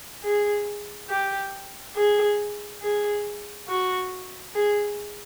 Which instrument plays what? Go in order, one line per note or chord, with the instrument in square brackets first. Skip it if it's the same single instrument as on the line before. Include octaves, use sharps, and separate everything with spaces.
[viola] G#4
G4
G#4
G#4
F#4
G#4